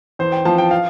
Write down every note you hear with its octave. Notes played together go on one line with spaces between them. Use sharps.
E2 C5
G5
F3 A5
G5
F5